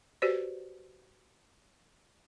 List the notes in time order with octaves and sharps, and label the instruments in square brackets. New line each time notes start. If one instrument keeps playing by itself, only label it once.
[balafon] F#4 G4 B4 C5 D5